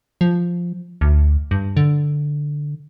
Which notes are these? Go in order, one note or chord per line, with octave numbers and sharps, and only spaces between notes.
F3
D2
G2
D3